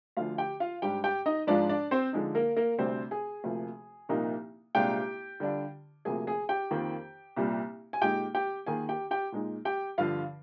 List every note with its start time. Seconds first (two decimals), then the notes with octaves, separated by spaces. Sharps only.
0.17 D2 D3 F3 F4 F5
0.38 G4 G5
0.60 F4 F5
0.82 G#2 G3 D4 G4 G5
1.04 G4 G5
1.26 D#4 D#5
1.47 G#2 F3 G#3 D4 F4 D5
1.69 D4 D5
1.91 C4 C5
2.13 D3 F3 G#3 D#4
2.35 A#3 A#4
2.56 A#3 A#4
2.78 D2 C3 G3 C4 D4 C5
3.11 G#4 G#5
3.44 D2 C3 F3 A#3
4.09 C2 A#2 F3 A#3 D#4
4.75 C2 A#2 G#3 D4 F4 G4 G5
5.40 D3 G3 D4 F4
6.05 D2 C3 F3 A#3 G#4 G#5
6.27 G#4 G#5
6.49 G4 G5
6.71 F2 D#3 A#3
7.36 C2 A#2 G3
7.93 G#5
8.01 A#2 G#3 D#4 G4 G5
8.35 G4 G5
8.66 D#2 D#3 A#3 F4 G#4 G#5
8.89 G4 G5
9.11 G4 G5
9.32 A#2 G#3 D#4
9.65 G4 G5
9.98 G2 D3 F3 F4 F5